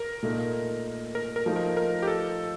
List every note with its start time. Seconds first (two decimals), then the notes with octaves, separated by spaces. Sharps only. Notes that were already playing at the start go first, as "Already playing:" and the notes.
Already playing: A#4
0.23 A#2 A3 D#4
1.15 A#4
1.36 A#4
1.46 F3 A3 D#4
1.56 A#4
1.77 A#4
2.02 G4
2.07 A4